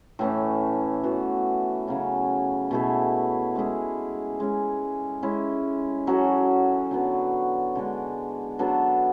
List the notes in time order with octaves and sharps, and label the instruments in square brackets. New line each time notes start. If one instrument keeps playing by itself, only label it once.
[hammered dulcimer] A2 E3 A3 C#4
E3 B3 F#4
C#3 F#3 C#4
B2 A3 E4 G#4
G#3 C#4 E4 G#4
G#3 C#4 G#4
G#3 C#4 E4
F#3 C#4 F#4 A4
D3 F#3 B3
D3 G#3 D4
F#3 B3 D4 A4